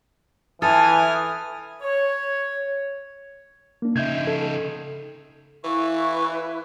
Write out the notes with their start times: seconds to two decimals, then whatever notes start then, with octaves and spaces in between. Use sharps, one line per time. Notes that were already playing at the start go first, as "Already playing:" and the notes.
0.62 E3 A4 G#5 D#6 F6
1.82 C#5
3.82 A#3 D4
3.96 C#3 D#4 E5 G6 G#6
4.27 A4
5.64 E3 E4 B4 F5 C#6